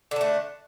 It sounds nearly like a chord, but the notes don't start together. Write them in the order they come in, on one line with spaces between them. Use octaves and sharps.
D3 D4 A3